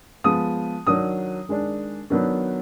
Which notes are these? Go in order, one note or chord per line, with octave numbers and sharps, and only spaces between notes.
F3 G#3 B3 D#6
D#3 F#3 D4 D#6
D#3 G#3 D4
D#3 F#3 B3 D4